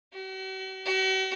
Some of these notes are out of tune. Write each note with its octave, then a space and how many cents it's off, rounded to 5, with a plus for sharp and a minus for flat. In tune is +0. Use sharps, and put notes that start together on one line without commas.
F#4 +45
F#4 +45